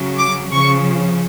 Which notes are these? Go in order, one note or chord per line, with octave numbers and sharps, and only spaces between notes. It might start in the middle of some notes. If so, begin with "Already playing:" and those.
Already playing: C#3 F#3
D6
C#3 F3 C#6